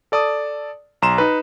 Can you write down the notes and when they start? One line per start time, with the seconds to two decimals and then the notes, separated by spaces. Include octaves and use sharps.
0.12 A4 D5 A5 D#6
1.02 B1 A#5 C6 E7
1.18 D#4 B4